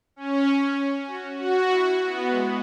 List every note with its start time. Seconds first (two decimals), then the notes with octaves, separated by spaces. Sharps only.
0.16 C#4
1.07 F#4
1.37 F#4
1.69 E4
1.99 B3
2.30 G#3